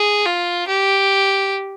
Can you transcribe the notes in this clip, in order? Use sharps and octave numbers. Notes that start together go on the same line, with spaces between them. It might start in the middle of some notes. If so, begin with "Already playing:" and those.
Already playing: G#4
F4
G4